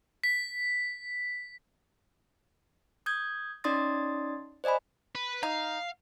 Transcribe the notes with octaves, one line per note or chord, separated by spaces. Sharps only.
B6
D#6 G6 G#6
C#4 D#4 D5 C6 D#6 A6
C5 D5 D#5 G#5 B5
B4
D#4 F5